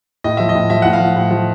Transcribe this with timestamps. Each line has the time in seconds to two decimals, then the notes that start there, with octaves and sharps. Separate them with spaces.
0.24 A2 D#5
0.37 F3 E5
0.49 D#5
0.55 A2
0.70 F3 E5
0.82 A2 F#5
0.93 F5
1.00 F3
1.17 A2
1.31 F3